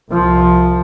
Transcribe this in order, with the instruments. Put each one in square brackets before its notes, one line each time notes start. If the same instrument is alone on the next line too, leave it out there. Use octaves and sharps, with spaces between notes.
[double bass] C2 F3